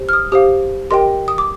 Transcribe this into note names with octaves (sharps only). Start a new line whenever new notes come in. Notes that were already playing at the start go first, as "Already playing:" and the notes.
Already playing: G4 C5
F6
D#6
G4 C5 F5 D#6
G4 A#4 D#5 G5 C6
D#6
D6